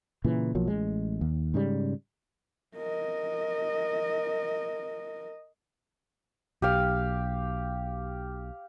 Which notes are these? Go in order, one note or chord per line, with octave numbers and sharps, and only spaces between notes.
A#2 C#3 E3
B1 F3 F#3 A#3
A1 G#3
D#2
G#2 C#3 G3
A#4 D#5
B1 G4 F5